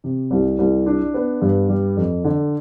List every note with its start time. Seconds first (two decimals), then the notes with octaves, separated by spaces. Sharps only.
0.04 C3
0.31 C2
0.59 C2
0.86 D4
1.14 B3
1.42 G2
1.69 G3
1.97 F2
2.24 D3